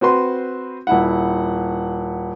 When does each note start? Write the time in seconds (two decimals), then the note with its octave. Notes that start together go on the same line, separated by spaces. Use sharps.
0.01 C4 F#4 B4 C6
0.87 D#1 E4 F#5